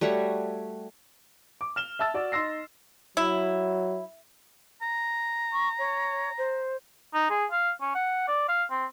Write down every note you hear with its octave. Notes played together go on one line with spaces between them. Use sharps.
G3 A3 F#4 C#5
D6
F6 E7 G7
E5 A5 E6 A6
F#4 D5
D#4 C6 E6 A#6 C7
F#3 E4
A#5
C#6
C#5
C5
D#4
G#4
F5
C#4
F#5
D5
F5
C4